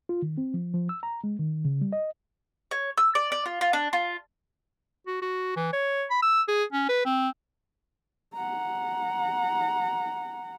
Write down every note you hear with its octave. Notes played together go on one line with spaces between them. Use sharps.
F4
D#3
C4
F3
F3
E6
A#5
G#3
D#3
C#3
G3
D#5
C#5
E6
D5
D5
F4
F4
D4
F4
F#4
F#4
E3
C#5
B5
E6
G#4
C#4
B4
C4
F#5 A#5